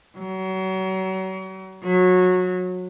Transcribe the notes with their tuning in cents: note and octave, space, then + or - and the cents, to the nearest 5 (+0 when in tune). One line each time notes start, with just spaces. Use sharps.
F#3 +35
F#3 -20